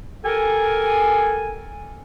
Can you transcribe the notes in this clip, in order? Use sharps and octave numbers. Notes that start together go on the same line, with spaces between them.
G4 A4 A#4 G#5